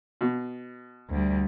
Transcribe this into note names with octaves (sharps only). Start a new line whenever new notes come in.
B2
D2 G3